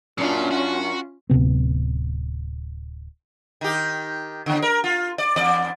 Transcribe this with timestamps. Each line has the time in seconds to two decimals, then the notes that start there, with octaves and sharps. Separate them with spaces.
0.18 F#2 A#2 C#4 D4 F4
0.51 F#4
1.30 D1 C#2 C3 B3
3.61 D#3 G4
4.46 D#2 D3
4.62 A#4
4.84 F4
5.18 D5
5.36 E2 D5